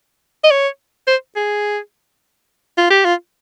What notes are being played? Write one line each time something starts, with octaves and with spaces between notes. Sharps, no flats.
D#5
C#5
C5
G#4
F4
G4
F4